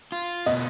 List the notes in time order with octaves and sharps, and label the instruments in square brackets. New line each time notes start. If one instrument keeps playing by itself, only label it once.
[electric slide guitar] F4
[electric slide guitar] B2 [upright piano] D#5